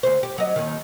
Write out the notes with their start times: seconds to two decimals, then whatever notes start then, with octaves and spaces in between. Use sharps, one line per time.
0.03 D2 C5
0.23 G4
0.38 F#3 D#5
0.56 D#2 D#3